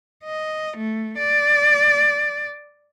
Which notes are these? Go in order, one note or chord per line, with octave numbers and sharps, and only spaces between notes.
D#5
A3
D5